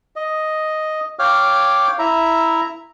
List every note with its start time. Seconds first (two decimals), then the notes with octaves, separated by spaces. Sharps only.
0.16 D#5
1.19 C#5 F5 G5 D6 F6
1.99 E4 E5 A#5